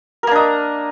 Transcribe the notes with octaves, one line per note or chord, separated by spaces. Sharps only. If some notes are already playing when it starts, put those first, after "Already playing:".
A#3 D4 A#4 D#5